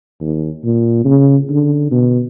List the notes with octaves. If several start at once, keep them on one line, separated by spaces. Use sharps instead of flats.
D#2
A#2
C#3
D3
B2